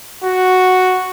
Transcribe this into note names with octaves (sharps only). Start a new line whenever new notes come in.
F#4